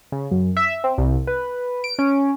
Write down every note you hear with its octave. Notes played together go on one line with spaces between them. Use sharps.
C#3
F#2
E5
C4
C2
B4
D7
C#4